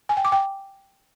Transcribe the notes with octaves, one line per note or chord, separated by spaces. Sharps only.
G#5
G5
D6
G5